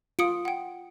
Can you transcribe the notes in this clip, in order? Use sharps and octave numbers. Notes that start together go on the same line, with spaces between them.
F4 D#6 C#7 D7
F#5 G5